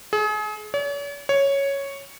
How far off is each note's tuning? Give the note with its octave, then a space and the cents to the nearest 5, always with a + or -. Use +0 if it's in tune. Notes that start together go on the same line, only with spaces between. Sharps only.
G#4 +35
C#5 +45
C#5 +0